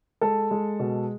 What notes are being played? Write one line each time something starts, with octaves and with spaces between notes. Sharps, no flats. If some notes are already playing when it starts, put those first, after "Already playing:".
G#3 A4
G#3
B2